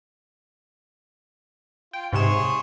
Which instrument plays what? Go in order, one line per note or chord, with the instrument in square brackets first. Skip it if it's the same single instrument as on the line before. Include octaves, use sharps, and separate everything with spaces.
[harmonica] F4 [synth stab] G5
[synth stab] G#2 C3 E7 [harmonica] G#4 C#5 C6